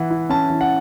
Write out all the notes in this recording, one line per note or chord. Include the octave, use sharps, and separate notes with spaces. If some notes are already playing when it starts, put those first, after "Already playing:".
Already playing: E3 E4 F#5
E4
C#4 A5
E3
F#5